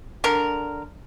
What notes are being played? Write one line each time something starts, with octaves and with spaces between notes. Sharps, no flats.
D3 A#4